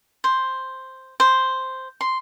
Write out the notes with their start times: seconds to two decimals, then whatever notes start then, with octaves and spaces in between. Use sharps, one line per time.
0.24 C5
1.20 C5
2.01 C6